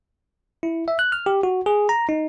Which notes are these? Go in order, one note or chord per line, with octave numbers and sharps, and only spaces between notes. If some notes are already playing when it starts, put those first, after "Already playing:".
E4
E5
F#6
F6
G4
F#4
G#4
A#5
D#4